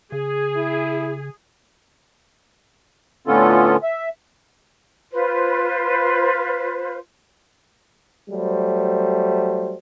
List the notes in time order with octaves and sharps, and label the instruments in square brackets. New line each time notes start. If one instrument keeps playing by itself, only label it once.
[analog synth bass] C#3 [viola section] G#4
[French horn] E4
[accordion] A2 D3 B3 C#4 F4 A4
E5
[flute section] F4 B4 C5
[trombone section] F#3 G3 A3 C5